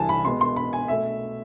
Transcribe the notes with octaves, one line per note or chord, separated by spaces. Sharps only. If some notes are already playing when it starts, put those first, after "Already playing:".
Already playing: C2 C3 E3 G#5 A5
B5
B2 G#3 B3 C6
C6
B5
G#5
B2 A3 E5